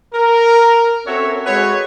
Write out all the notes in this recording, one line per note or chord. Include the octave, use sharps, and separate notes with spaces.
A#4
C4 C#4 F#4 A4 C#5 E5
G#3 F#4 B4 C#5